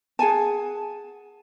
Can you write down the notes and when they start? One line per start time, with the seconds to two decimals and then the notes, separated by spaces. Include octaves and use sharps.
0.19 G#4 F#5 G#5 A5